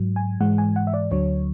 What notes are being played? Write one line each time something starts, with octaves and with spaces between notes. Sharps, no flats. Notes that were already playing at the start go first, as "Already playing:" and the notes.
Already playing: G#2 F#3
G#5
G#2 E3 G#3 F#5
G#5
F#5
E5
D5
D2 D3 F#3 C#5